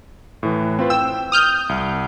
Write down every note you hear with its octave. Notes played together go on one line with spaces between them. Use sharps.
A2 E3
C4 F4 B4
G5 E6
D#6 F6 G6
C2